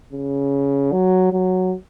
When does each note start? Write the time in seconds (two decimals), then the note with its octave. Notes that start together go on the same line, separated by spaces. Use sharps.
0.12 C#3
0.92 F#3
1.32 F#3